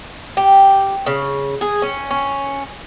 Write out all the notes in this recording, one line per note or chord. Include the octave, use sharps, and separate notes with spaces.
G4
C#3
G#4
C#4
C#4